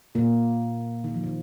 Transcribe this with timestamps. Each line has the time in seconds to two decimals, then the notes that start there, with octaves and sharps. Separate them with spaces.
0.15 A#2 A#3
1.04 D#3
1.14 F3
1.24 D#3